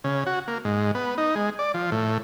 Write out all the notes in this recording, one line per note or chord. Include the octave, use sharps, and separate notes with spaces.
C#3
F#4
A#3
G#2
B3
D#4
G#3
D5
F3
A2